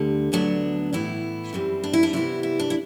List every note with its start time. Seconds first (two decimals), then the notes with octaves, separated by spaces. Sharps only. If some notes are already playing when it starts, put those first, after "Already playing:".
Already playing: D2 D3 G3
0.32 D2 D3 F#3 B3 D4
0.93 A2 E3 B3 E4
1.53 F#2 E3 G3 C4
1.84 D4
1.93 E4
2.03 D4
2.13 C3 E3 G3 B3 E4
2.43 E4
2.60 D4
2.70 E4